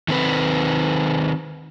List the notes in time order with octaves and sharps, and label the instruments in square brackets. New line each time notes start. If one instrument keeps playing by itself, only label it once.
[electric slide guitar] D#3 C4 B4